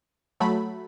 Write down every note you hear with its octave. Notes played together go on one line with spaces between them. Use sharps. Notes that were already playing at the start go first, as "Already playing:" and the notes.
F#3 A3 B5